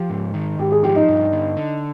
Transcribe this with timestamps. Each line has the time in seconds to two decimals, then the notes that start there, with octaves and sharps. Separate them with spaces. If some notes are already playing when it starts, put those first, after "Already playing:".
Already playing: F3 G4
0.10 G#2
0.34 D#3
0.59 G#2 G4
0.72 G#4
0.83 F3 G4
0.96 D#4
1.09 G2
1.32 D3
1.57 D3